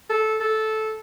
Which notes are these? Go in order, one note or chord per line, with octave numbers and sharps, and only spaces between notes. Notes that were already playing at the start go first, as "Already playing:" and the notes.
A4
A4